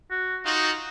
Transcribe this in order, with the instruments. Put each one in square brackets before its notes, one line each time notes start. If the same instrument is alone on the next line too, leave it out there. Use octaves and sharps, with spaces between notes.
[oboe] F#4
[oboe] D#4 [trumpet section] F4 F#4